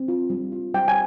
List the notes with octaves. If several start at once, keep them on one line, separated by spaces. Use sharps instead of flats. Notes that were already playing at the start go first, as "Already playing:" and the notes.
Already playing: C4
F4
G3
F4
G3 G5
G#5